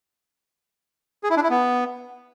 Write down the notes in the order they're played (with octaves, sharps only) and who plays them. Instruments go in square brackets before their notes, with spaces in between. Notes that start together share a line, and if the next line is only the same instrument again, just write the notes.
[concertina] G#4
E4
D4
E4
B3